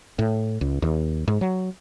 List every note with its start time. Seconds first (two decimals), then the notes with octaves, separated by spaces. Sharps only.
0.19 A2
0.61 C#2
0.82 D#2
1.28 G#2
1.41 F#3